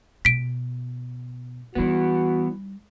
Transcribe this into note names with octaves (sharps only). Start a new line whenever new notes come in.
B2 B6 D7
E3 G3 B3 D#4 F#4